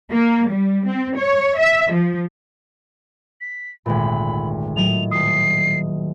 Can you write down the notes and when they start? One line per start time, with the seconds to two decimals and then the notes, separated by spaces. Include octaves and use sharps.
0.12 A#3
0.50 G3
0.87 C4
1.18 C#5
1.59 E5
1.94 F3
3.41 B6
3.86 G#1 D2 A#2 B5
4.76 A2 D#3 F#3 F7
5.11 D#1 D#6 C7